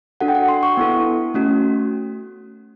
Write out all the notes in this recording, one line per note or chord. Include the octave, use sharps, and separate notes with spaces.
D4 F#4 A4 F#5
G5
F#5
C6
C#6
B3 E4 A4
A3 C#4 F#4